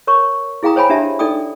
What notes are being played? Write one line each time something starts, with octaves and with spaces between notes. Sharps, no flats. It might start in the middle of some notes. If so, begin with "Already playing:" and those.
A#4 C#5 C#6
E4 G#4 F5 G5 A#5 D#6
C5 C#5 G5 G#5 B5
D4 G4 E5 A5
D#4 A4 D5 G5 D#6